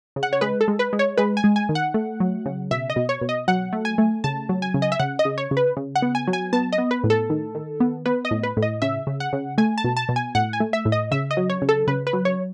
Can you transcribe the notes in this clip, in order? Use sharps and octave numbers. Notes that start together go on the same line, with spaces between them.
C#3
F#5
C#5
G#3 B4
A4
G#3
B4
G#3
C#5
G#3 B4
G#5
G#3
G#5
D#3
F#5
A3
F#3
C#3
B2 E5
D#5
B2
C#5
B2
D#5
F#3 F#5
A3
G#5
A3
C#3 A5
F#3
G#5
C#3
D#5
E5
C#3 F#5
D#5
C#3
C#5
C#3
B4
C#3
F#5
B3
G#5
F#3
G#5
B3 A5
D#5
B3
B4
A2
A4
D#3
D#3
B3
B3 B4
D#5
A2
B4
A2
D#5
C#3 E5
C#3
F#5
C#3
A3 G#5
A5
B2
A5
B2
G#5
A2 F#5
G#5
A3
E5
A2
D#5
C#3 E5
D#5
F#3
C#5
C#3
A4
C#3 B4
B4
F#3
C#5